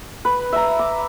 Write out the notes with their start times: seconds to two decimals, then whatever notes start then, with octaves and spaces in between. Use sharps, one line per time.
0.25 B4
0.52 E5 A#5
0.79 D6